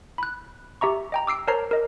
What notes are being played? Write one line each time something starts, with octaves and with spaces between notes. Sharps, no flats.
B5 F#6
G4 E5 A#5 C#6
D#5 G5 A#5
D6 E6 C7 D7
A#4 C5 C#5 A5 A#5 C7
A#4 D#5